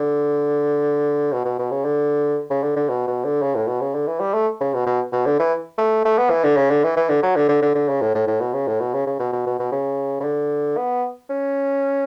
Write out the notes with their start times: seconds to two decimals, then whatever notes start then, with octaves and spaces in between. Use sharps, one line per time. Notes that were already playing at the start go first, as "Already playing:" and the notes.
Already playing: D3
1.32 B2
1.45 B2
1.59 B2
1.71 C#3
1.85 D3
2.50 C#3
2.63 D3
2.76 D3
2.89 B2
3.07 B2
3.24 D3
3.42 C#3
3.55 A2
3.68 B2
3.81 C#3
3.95 D3
4.07 E3
4.20 G3
4.34 A3
4.60 C#3
4.74 B2
4.86 B2
5.12 B2
5.26 D3
5.39 E3
5.78 A3
6.05 A3
6.18 B3
6.30 E3
6.44 D3
6.57 C#3
6.70 D3
6.84 E3
6.97 E3
7.09 D3
7.23 F#3
7.36 D3
7.49 D3
7.62 D3
7.75 D3
7.88 C#3
8.01 A2
8.15 A2
8.27 A2
8.40 B2
8.54 C#3
8.67 A2
8.80 B2
8.94 C#3
9.07 C#3
9.19 B2
9.32 B2
9.46 B2
9.59 B2
9.72 C#3
10.20 C#3
10.24 D3
10.77 B3
11.30 C#4